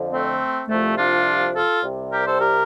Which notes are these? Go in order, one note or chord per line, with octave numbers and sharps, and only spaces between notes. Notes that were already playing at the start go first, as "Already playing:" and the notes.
Already playing: F2 D3 F3
A3 C4
C2 C3 F3 A3
D4 F4
F4 A4
C2 C3 G3
G4 A#4
A4 C5
G4 A#4